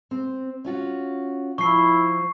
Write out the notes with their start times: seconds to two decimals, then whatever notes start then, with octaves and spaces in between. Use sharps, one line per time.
0.11 C4
0.65 C#4 F4 F#4
1.58 F3 E4 C#6 C7